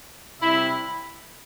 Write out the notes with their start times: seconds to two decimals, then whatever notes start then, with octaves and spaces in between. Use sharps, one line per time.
0.41 C3 G3 E4 E5